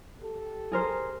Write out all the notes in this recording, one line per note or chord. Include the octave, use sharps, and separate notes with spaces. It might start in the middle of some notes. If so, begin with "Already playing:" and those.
G4 A4
G#4 A#4 C5